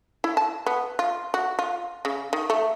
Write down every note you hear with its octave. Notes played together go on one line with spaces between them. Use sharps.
E4
A5
B3
F4
F#4
F4
C#3
D#3
A3